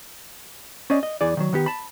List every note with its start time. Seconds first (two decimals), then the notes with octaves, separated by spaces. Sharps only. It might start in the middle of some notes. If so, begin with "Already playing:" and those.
0.90 C#4 C5 D5 D#5
1.03 D#5
1.21 E2 E3 G#4 D5
1.37 D#3 F3 F#3
1.53 D#3 B3 G4
1.66 A5 B5